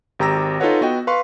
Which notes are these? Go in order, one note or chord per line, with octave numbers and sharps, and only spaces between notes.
G#1 G4 A#5 E6 A#6
D#4 F4 A4 B4 C#5 F#5
B3 F#4 D#5 G5
B4 F5 C6 C#6